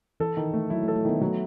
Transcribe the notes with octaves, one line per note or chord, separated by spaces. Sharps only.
E3 A4
D#3
A3
F#3 E4
A3
A4
A3
D#3 B3
F#3 A3